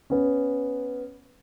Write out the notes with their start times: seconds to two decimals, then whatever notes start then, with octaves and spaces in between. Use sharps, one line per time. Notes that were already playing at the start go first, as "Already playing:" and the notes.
0.10 B3 C#4